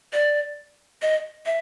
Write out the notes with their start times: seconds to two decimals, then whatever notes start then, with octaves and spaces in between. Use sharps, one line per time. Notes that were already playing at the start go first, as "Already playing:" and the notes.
0.13 D5
1.02 D#5
1.46 E5